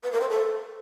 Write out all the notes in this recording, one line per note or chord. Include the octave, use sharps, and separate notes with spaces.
B4
A#4
C5
A4